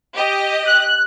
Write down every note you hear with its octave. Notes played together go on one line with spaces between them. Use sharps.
G4 D#5
F#6